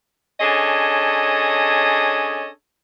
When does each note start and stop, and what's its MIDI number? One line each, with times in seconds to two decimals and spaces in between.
0.40 2.48 61
0.40 2.48 62
0.40 2.48 68
0.40 2.48 69
0.40 2.48 73
0.40 2.48 75